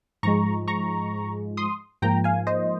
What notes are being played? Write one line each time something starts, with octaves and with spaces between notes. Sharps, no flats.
G#2 F3 G#3 A#5 C#6
A#5 C#6
C6 D#6
G#2 F3 A#3 G5 A#5
F5 G#5
C5 D#5